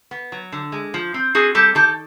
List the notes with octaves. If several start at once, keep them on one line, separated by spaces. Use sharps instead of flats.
B3
F#3
D3
G#3
F3
C4
C4 F#4 G#4
G3 G4 A4
D#3 G4 A4